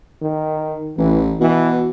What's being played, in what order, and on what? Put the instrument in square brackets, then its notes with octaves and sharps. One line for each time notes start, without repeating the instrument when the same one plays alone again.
[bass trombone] D#3
[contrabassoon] A1 [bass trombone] E3
[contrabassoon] B2 [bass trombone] E3